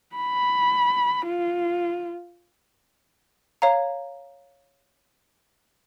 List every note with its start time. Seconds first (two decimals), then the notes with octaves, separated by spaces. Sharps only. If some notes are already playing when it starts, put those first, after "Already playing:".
0.16 B5
1.27 F4
3.62 C#5 F5 A#5